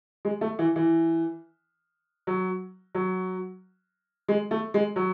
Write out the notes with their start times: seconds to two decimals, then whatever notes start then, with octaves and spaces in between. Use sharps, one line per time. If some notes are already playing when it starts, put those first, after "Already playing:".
0.25 G#3
0.41 A3
0.59 E3
0.76 E3
2.27 F#3
2.95 F#3
4.28 G#3
4.51 A3
4.74 G#3
4.96 F#3